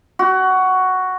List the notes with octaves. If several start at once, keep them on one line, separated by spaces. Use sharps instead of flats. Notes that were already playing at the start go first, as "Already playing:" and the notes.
F#4